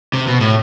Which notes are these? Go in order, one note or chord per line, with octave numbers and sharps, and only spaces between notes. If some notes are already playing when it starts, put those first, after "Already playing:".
C3
B2
A2